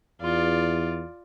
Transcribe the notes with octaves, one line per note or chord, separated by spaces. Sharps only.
E2 F4 D5